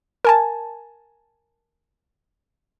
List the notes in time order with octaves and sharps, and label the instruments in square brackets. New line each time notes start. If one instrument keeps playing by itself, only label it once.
[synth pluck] A#4 G#5 A5